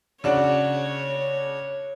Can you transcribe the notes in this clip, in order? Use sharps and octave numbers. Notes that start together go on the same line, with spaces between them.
C#3 D4 F#4 C#5